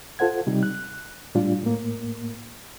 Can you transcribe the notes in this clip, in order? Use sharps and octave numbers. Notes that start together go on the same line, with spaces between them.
F4 A4 C5 F#5 G#6
C3 G3 D#4
F#6
A2 G3 D4 F4
A2 A#3